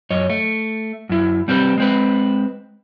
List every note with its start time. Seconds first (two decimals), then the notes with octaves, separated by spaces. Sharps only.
0.10 F#2 C#5 D#5
0.30 A3
1.09 F#2 E4
1.48 G3 C4 G4 B4
1.78 G#3 C4 B4